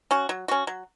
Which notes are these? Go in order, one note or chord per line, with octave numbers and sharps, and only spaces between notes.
C#4 F#4
F#3
C#4 F#4
F#3